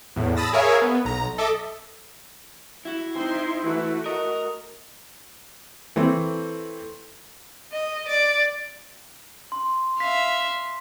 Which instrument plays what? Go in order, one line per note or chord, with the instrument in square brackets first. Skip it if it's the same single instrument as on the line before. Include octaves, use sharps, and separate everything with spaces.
[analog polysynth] E2 A2
A5 B5 D#6 E6 A6 A#6
G#4 A#4 C#5 E5 F5 G#5
B3
B1 A#5
A4 D#5 E5 D6
[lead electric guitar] E4 [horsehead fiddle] F#4
[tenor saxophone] C4 [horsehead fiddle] D#4 C5 [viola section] C6
[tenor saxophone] E3 [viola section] A3 [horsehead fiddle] F#4
[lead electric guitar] A#4 [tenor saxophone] D#5
[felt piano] E3 A3 C4
[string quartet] D#5
D5
[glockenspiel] C6
[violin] E5 F5 [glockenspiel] B6